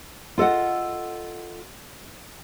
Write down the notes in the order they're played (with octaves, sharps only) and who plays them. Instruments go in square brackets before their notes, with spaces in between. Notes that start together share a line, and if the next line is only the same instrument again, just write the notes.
[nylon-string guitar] F4 A4 D#5 F#5